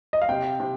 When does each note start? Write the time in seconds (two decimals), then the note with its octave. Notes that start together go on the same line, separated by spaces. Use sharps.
0.13 D#5
0.22 F5
0.29 C3 G5
0.60 C3